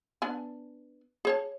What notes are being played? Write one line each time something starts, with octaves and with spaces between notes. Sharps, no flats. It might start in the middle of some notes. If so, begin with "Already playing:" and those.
B3 D4 G#5
G#4 C#5 A5